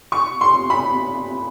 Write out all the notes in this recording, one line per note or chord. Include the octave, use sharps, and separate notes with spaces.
C#6
C6
B5